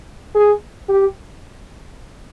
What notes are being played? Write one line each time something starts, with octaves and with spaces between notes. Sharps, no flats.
G#4
G4